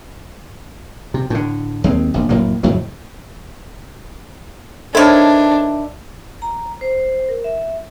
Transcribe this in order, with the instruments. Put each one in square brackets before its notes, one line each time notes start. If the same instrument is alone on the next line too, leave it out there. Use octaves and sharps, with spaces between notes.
[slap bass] C3
A2 D3
D#2 G#3 C4
E1 A#1
F1 A2 F#3 A#3
F2 A2 C#3 F#3
[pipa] D#3 E4 [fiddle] D4 [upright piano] A4 C5 C#5
[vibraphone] A#5
C5
A#4
E5